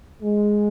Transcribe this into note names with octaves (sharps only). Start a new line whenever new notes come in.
G#3